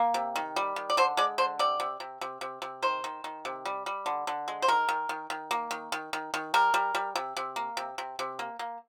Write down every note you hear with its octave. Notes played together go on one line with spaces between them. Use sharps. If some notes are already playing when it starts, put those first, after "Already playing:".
Already playing: A#3
C3
D#3
G3
D#3
D5
D3 C5
G#3 D5
D3 C5
C3 D5
C3
C3
C3
C3
C3
D#3 C5
D#3
D#3
C3
G3
G3
D3
D3
G#3
C5
D#3 A#4
D#3
D#3
D#3
A#3
D#3
D#3
D#3
D#3
G3 A#4
G3
G3
C3
C3
A#3
C3
C3
C3
A#3
A#3